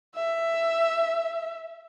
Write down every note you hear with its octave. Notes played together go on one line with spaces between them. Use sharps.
E5